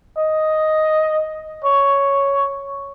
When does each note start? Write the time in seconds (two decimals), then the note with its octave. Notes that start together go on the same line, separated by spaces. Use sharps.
0.18 D#5
1.64 C#5